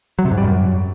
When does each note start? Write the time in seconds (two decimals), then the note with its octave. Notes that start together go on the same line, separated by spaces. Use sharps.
0.19 F#3
0.25 C3
0.31 G#2
0.38 G3
0.44 F#2